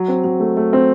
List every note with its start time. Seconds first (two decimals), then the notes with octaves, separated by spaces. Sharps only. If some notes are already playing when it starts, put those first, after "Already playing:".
Already playing: F#3
0.08 C4
0.24 F#3
0.40 A3
0.57 A3
0.73 C4